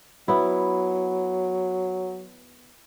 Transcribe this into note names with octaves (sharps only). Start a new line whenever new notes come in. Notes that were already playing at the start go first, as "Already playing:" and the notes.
F#3 B3 E4